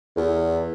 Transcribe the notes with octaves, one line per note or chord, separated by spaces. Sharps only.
E2